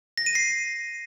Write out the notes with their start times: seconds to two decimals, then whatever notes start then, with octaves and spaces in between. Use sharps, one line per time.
0.18 A#6
0.26 D#7
0.35 C7